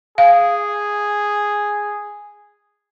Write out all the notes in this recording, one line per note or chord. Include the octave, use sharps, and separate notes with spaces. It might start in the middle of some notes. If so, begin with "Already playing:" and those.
G#4 F5